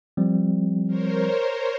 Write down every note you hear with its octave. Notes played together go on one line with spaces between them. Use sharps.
F3 G3 C4
A#4 C5 C#5